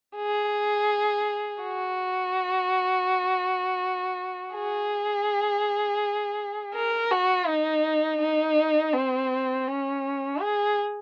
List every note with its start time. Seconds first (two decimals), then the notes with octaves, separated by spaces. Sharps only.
0.16 G#4
1.62 F#4
4.54 G#4
6.75 A#4
7.11 F#4
7.47 D#4
8.21 D#4
8.93 C4
9.67 C#4
10.41 G#4